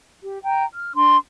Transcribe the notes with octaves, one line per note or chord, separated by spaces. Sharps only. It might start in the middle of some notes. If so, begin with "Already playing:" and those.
G4
G5 A#5
F6
D4 C6